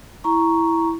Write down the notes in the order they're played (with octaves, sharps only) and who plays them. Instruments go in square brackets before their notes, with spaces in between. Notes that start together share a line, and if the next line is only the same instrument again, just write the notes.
[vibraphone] E4 A#5 C#6